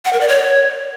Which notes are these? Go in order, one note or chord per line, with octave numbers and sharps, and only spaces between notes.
F#5
A#4
D5
C#5